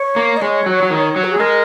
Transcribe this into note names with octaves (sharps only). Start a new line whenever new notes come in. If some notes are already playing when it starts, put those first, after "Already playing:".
Already playing: C#5
A#3
D#5
G#3 C#5
F#3
F#3
D#3
F#3
F#4
G#4
G#3 A#4